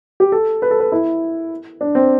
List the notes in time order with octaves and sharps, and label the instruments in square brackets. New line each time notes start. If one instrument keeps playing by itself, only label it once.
[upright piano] G4
A4
B4
A4
B4
E4
D4
C4